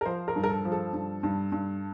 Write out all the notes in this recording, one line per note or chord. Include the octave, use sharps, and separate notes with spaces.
A#4
F3 C5
A#4
G2
A#4
A4
F3
A4
G2
G2
G2